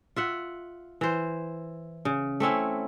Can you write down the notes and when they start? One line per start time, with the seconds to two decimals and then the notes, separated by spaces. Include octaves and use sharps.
0.16 F4 E5 F#5
1.01 E3 C5
2.05 C#3
2.40 A3 C4 C#4 E4